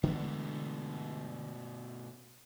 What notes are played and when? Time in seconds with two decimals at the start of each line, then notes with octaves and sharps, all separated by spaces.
0.03 B2 D3 E3 G#3 A3 B3